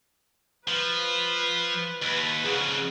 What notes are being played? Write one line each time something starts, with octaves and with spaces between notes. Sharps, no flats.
F3 B4
D#2 B4
F2 C#3 G#4 F#5